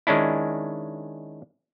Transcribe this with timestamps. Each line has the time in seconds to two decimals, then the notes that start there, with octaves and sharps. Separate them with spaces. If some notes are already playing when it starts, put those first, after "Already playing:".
0.07 D#3 G#3 C#4 D4 E4